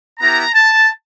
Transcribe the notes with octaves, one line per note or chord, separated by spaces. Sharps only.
B3 E4 G4 A#5
A5